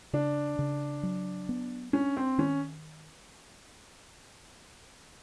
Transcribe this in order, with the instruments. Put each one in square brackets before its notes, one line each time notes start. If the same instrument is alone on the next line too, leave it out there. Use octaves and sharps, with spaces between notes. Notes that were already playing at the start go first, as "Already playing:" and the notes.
[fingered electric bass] C#3 [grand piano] D4
[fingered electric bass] C#3
F#3
B3
[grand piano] C#4 [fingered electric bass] D4
[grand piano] C4
[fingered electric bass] D#3 [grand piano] C#4